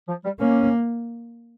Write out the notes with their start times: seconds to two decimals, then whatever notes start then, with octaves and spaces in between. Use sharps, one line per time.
0.08 F3
0.24 G3
0.40 A#3 C#4